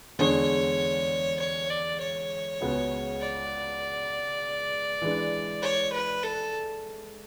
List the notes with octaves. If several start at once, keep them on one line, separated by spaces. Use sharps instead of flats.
E2 D3 G#3 D4 G#4 C#5
C#5
D5
C#5
C#2 C#3 G#3 B3 F#4
D5
E3 G#3 D4
C#5
B4
A4